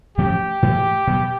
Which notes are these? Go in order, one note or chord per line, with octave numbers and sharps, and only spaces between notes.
G#2 F3 A3 C#4 G4
G#2 E3 A3
B2 F#3 B3